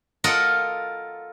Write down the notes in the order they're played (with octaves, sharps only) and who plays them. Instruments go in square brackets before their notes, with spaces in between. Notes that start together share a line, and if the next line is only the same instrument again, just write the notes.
[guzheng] F4 A4 A#4 D#5 F#5